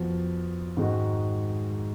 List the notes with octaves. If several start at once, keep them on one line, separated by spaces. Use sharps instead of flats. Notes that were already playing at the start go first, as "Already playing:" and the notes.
Already playing: F2 F3 B3 F#4
G#2 D#3 G#3 D#4 F#4